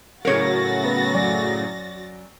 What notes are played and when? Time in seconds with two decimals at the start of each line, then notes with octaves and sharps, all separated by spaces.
0.25 A2 C#3 F#3 F#4 A#4 C#5 A6 A#6
0.84 B3
1.14 F#2 D5 G#5